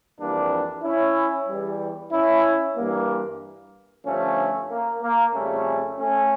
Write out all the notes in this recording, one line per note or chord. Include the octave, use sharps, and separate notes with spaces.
F2 E3 G3 A#3 D4
C#4 E4
E2 E3 G3
C#4 E4
G2 E3 G3 A#3
G2 D3 F3 A3 C#4
A#3
A#3
F2 C#3 G3 A3 C#4
A3 C#4